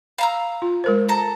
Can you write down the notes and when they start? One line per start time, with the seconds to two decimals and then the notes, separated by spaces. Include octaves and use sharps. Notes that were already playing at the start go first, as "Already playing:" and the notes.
0.18 F5 A#5 B5 E6
0.62 F4
0.84 G#3 A#4 C5
1.09 A4 A5 A#5